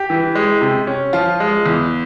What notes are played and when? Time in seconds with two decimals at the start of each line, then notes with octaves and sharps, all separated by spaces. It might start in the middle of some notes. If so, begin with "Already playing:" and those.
Already playing: G4
0.10 E3
0.35 G#3
0.61 C3
0.87 C#4
1.13 F3 F4
1.40 G#3
1.66 E2